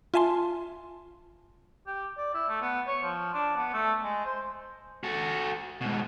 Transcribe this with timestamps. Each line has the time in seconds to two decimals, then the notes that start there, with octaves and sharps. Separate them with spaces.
0.14 F4 E5 G#5 A5 C6
1.87 G4
2.18 D5
2.34 E4
2.49 A3
2.62 B3
2.87 C#5
3.02 F3
3.34 D4
3.57 B3
3.73 A3
4.03 G#3
4.25 C5
5.03 F#4 A4
5.81 G#2 B2